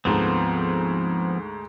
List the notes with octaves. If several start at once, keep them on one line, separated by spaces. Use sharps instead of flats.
D2 G#2 F3 B3 C4 A4